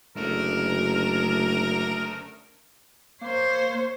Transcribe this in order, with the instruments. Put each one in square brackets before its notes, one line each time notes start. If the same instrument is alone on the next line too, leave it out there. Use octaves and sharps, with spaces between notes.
[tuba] F#1 [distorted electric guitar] A3 D4 [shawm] A#4
[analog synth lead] A#3 [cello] C5 C#5